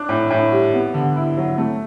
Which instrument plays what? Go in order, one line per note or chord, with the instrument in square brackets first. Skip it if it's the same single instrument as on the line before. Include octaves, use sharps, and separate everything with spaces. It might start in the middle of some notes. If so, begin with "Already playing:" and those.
Already playing: [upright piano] D4 D6 F#6
A2
A2
G3
B3
D3
E4
F#3
A3